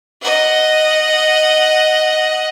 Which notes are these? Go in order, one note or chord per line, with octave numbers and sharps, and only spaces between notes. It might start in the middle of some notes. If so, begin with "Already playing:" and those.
D#5 F#5